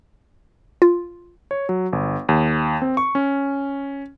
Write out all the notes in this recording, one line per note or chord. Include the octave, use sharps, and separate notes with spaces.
F4
C#5
F#3
G1
D#2
C4
C#6
C#4